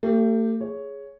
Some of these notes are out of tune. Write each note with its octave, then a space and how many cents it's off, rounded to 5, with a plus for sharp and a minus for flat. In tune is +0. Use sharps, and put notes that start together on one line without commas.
A3 +40 G4 +0
G#4 +0 C#5 +5